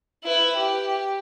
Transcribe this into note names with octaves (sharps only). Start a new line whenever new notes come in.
E4 B4
G4